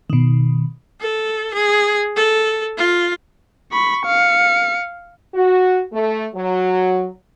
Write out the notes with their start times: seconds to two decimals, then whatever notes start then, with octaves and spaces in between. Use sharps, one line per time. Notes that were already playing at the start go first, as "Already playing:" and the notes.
0.10 B2 D#3
1.01 A4
1.54 G#4
2.16 A4
2.77 F4
3.72 B5 C#6
4.06 F5 C#7
5.34 F#4
5.93 A3
6.35 F#3